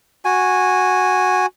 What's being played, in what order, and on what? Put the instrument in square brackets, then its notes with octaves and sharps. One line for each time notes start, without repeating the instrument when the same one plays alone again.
[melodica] F#4 G#5